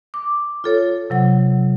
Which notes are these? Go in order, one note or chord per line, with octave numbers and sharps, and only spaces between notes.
D6
F4 A4 C#5
C3 F#3 F#5